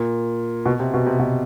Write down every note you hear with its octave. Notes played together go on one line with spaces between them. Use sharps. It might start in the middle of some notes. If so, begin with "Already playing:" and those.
Already playing: A#2
B2
C3
B2
C3
B2